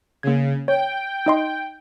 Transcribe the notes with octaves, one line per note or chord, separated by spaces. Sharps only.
C#3 A#3 G#6
C#5 G5
D#4 D#5 C6